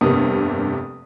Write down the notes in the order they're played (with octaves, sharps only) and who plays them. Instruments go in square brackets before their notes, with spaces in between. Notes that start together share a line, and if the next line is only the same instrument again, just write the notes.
[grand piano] F1 B3 D#6 [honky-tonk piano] G2 C3 A#3